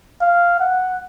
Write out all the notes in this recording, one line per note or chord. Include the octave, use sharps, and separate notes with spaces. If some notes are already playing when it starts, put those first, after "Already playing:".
F5
F#5